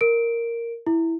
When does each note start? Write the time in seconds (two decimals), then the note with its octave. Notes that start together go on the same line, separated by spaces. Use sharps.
0.01 A#4 D7
0.87 E4